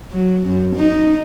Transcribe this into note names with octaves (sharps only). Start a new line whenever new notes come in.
F#3
F#2
D#4